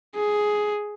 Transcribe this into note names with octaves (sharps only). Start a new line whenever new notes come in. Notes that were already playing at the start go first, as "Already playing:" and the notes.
G#4